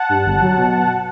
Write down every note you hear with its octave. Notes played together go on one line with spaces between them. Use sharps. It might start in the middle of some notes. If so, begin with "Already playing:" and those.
Already playing: F#5 A5
G2
G1
F#3
B2